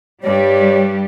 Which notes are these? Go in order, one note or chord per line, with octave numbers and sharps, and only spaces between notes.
G2 G3 G4 C#5